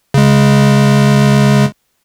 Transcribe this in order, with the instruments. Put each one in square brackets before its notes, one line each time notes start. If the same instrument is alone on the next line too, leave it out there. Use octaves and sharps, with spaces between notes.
[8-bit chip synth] C#3 G#3